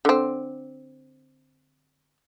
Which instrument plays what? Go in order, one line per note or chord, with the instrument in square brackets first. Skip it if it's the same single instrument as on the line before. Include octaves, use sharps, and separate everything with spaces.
[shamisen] D3 C4